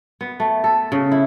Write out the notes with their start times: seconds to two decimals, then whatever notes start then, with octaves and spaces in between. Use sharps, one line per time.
0.21 B3
0.40 A3
0.64 A4
0.92 C#3
1.12 E4